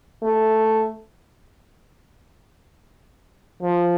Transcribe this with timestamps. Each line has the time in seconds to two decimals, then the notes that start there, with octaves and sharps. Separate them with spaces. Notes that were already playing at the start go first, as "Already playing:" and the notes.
0.23 A3
3.63 F3